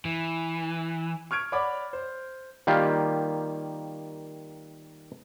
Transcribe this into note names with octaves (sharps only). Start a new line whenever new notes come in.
E3
C#6 F6 G#6 D7
C#5 D5 F#5 B5 D6
C5
D#3 G3 A#3 F4 G4